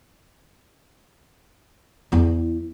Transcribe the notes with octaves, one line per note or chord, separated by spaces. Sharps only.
E2 E4